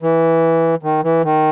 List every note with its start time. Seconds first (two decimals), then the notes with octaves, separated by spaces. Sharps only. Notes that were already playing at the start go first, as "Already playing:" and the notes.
0.02 E3
0.83 D#3
1.04 E3
1.24 D#3